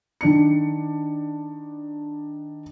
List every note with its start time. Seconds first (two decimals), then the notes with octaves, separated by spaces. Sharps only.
0.21 D#3 D4 C#7